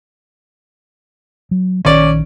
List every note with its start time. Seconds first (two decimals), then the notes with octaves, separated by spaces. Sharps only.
1.51 F#3
1.85 A#1 D#3 C#4 D5